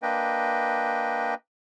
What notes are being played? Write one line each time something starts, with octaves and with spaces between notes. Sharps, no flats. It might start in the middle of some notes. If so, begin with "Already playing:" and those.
A#3 D4 B4 D#5 G5